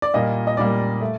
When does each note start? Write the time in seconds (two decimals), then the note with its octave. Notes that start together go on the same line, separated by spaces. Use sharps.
0.02 D5
0.14 A#2 G3 A#3 D#5
0.47 D#5
0.57 A#2 G3 A#3 D5
1.01 A3